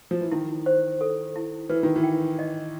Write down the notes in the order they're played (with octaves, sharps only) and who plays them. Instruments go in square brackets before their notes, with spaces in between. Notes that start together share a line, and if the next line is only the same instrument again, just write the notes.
[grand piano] F3
E3
[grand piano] D#3 [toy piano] E4
[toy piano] C5
A4
E4
[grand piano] E3 [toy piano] B4
[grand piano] D#3
E3
[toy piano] G5
D#5